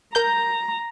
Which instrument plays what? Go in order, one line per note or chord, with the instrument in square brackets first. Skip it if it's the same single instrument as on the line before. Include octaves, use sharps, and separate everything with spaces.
[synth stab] A#4 G6 [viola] A#5